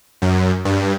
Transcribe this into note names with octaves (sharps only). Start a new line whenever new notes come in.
F#2
G2